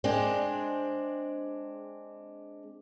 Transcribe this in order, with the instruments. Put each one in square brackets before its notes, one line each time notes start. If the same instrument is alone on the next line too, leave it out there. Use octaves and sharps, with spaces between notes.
[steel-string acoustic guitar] G#3 C4 D4